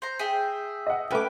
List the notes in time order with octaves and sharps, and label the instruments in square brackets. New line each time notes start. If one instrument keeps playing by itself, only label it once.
[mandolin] C5 A#5
G#4 E5 G5
[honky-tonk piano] D#5 F#5
[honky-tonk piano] A3 B4 G5 [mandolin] C#4 D6